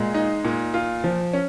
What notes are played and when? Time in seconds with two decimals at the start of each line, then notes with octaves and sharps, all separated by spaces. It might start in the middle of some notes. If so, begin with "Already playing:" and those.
Already playing: A#2 G#3
0.14 D#4
0.44 A#2
0.74 F4
1.04 F3
1.33 C#4